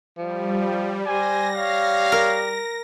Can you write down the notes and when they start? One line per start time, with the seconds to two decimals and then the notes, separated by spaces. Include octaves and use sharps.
0.18 F3 G3
1.06 G3 C5 G#5 A#6
1.55 C#5 F5
2.12 A#4